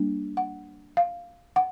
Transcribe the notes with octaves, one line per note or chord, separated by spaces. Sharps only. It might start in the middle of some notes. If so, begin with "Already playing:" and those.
Already playing: G3 A#3 D4
F#5
F5
F#5